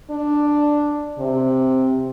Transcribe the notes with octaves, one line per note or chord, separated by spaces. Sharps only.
D4
C3